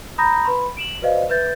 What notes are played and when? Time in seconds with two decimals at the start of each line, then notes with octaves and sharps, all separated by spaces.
0.18 A#5 B5 D#6 G6 A#6
0.44 B4 B5 C6
0.77 D7 E7 F#7
1.02 F#4 B4 C5 D5 D#5 F5
1.30 B4 E5 G6 A6